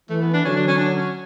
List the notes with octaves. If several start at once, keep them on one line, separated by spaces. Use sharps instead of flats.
E3 A3
B3
D4
D3 F#3 C#4
D4
C#4
D4
C#4